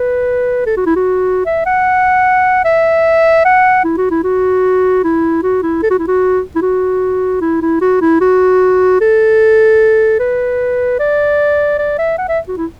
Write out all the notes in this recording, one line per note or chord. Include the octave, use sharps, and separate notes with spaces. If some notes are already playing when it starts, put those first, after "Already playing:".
Already playing: B4
A4
F#4
E4
F#4
E5
F#5
E5
F#5
E4
F#4
E4
F#4
E4
F#4
E4
A4
F#4
E4
F#4
E4
F#4
E4
E4
F#4
E4
F#4
A4
B4
D5
D5
E5
F#5
E5
F#4
E4